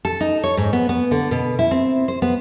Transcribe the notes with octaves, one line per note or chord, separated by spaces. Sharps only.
A4
D#4
C#5
G#2
B3
B3
D3
B2
E4
C4
C5
B3